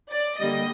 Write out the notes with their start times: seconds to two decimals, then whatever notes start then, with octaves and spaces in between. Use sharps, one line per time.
0.11 D5
0.40 D3 G3 A#3 D#5